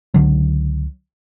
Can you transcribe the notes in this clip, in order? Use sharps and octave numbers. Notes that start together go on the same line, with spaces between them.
C#2 D3 F#3